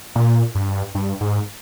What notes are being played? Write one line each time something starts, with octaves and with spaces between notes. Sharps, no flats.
A#2
G2
G2
G#2